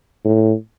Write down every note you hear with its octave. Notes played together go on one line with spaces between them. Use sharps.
A2